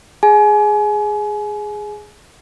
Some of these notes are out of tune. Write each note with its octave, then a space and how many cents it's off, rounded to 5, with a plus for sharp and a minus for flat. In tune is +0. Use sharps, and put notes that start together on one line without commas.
G#4 +0 G#5 +30